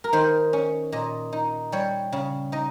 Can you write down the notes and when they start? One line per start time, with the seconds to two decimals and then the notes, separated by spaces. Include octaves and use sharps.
0.04 A#4
0.13 D#3 C5
0.53 C#4
0.92 A#2 D#5
1.33 D#4
1.72 G3 C#5
2.12 C#3
2.52 D#4 D#5